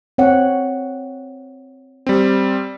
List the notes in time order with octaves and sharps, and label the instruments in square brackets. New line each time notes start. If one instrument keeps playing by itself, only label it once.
[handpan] C4 C#5 F#5
[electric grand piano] G3 C4